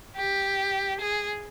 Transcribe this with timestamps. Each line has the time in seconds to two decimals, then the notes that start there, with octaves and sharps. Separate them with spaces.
0.17 G4
1.01 G#4